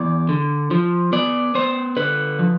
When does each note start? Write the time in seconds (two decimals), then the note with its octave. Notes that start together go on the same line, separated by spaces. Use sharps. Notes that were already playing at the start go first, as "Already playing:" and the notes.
Already playing: E2 D5
0.29 D3
0.71 F3
1.13 B3 D5
1.55 B3 C5
1.97 D3 B4
2.39 F3